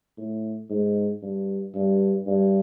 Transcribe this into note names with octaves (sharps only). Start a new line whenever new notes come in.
A2
G#2
G2
G2
G2